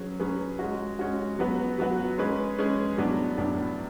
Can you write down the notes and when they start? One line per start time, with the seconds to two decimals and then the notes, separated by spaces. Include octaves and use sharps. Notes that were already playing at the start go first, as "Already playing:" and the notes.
Already playing: F#3 C#4 G#4 B4
0.20 F#3 C#4 G#4 B4
0.59 G#3 C#4 F#4
0.99 G#3 C#4 F#4
1.39 F#3 B3 F#4 B4
1.79 F#3 B3 F#4 B4
2.18 G#3 C#4 G#4 B4
2.58 G#3 C#4 G#4 B4
2.98 A2 F#3 B3 D4
3.37 A2 F#3 B3 D4